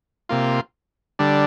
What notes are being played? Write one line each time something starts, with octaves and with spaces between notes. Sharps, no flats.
C3 A#3 F4
D3 G3 D4